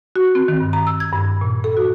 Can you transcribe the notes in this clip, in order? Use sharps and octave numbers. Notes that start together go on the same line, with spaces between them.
F#4
C4
D#3
G2
A#5
E6
G#6
G2
A#2
A4
F#4